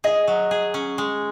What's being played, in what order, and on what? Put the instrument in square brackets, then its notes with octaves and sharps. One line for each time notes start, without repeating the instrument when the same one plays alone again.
[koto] G#4 [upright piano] D#5
[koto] F#3
G#4
C#4
G#3